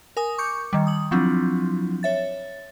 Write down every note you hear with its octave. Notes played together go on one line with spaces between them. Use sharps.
A#4 G#5 D#6
C#6 D6 G6 C#7
D#3 G3
D#6 F#7
F3 F#3 C4 D4 E4 F4
C#5 E5 A6